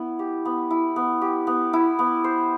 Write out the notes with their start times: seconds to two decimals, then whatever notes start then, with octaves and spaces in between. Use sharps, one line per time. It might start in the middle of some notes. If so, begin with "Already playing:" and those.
Already playing: B3 E4
0.19 G4
0.45 B3
0.71 E4
0.96 B3
1.22 G4
1.47 B3
1.73 E4
1.99 B3
2.24 C5